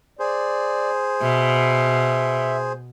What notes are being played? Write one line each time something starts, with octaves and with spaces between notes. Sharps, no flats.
G#4 C5 D5
B2 E5